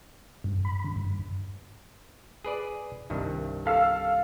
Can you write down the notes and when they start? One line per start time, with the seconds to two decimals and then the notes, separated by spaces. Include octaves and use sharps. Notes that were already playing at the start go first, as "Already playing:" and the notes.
0.44 G2
0.65 B5
0.84 D3
0.96 G2
2.45 G#4 B4 D5
3.10 C2 G2 D#3
3.66 A4 F5 E6